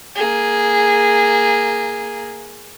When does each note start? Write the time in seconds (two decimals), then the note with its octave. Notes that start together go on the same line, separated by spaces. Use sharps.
0.15 A#3 G#4